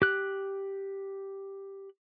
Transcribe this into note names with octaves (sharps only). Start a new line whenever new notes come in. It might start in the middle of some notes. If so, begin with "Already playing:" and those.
G4 F#6